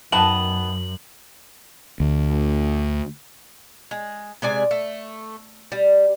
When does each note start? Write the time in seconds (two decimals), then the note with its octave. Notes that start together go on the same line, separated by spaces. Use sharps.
0.12 F#2 D#3 B3 A5 F#7
2.00 D2
3.91 G#3
4.42 C3 G#3 D5 G#5
4.71 A3
5.72 G3